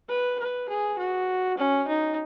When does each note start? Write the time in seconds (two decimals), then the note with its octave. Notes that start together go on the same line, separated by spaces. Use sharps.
0.09 B4
0.39 B4
0.69 G#4
0.98 F#4
1.58 C#4
1.88 D#4